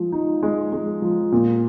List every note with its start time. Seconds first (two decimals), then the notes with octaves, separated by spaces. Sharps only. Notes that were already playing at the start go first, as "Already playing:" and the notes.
Already playing: F3 G#3
0.12 D#4
0.43 G#3
0.73 G#3
1.02 F3
1.32 A#2